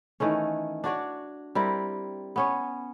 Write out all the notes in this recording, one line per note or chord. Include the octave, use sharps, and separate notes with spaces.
D#3 E3 A3 C#4
D4 F#4 C#5 D5
G3 C4 E4 A#4
B3 C#4 C#5